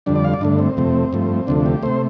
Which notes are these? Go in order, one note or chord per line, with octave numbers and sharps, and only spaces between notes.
F2 D3 G3 D4
D5
F5
D5
G2 D3 A3 D4
C4
F2 C3 A3
G2 F3 A3
D2 C3 F3 A3 D4
G4
C3 A3 C5